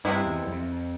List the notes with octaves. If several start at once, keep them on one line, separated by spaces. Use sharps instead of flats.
G2 C3 F3 G#3 E4
E2
F2